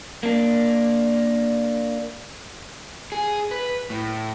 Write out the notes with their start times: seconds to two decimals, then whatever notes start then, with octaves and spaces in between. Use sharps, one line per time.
0.23 A#3 D4
3.12 G#4
3.51 B4
3.90 A2